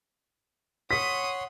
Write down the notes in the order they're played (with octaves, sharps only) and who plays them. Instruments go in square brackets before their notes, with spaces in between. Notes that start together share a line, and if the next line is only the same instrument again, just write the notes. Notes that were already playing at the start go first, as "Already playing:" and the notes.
[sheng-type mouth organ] C#5 F#5 C6 [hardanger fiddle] D#6 [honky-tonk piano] B6